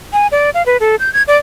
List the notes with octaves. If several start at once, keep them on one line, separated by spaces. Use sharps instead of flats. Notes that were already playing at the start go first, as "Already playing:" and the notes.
G#5
D5
F5
B4
A4
G6
G#6
D5